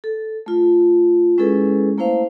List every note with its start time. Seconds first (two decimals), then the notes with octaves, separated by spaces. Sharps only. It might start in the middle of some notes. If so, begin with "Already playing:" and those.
0.04 A4
0.46 A3 F4
1.38 G#3 C#4 E4 G#4 A4 B4
1.98 A3 A#3 E4 C5 F5